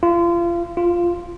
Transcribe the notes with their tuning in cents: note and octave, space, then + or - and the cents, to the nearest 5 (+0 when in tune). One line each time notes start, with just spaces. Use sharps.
F4 -30
F4 -5